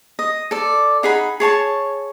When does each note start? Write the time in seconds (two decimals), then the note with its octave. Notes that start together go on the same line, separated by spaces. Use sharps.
0.19 D#5
0.51 A4 D5
1.03 D#4 G#4 F#5 B5
1.40 G#4 C#5 A5 C#6